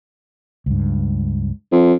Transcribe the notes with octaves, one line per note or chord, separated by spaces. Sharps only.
C#2 G2
F2